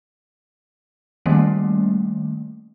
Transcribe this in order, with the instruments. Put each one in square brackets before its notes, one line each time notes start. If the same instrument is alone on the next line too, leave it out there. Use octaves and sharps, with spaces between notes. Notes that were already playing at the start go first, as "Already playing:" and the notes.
[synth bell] D#3 G3 A3 A#3 C#4